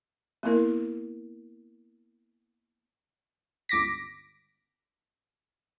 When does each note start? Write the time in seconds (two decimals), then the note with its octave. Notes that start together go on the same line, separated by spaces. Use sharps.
0.43 A#3 B3 E4 A#4
3.69 G1 C#2 D6 A#6 B6